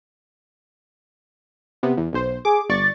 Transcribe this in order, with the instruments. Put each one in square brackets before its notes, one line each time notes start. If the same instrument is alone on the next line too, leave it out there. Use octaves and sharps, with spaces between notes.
[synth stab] C3 B3
E2
B1 C5
[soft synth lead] G#4 [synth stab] D6
[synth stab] G1 D5 C#6 [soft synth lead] A6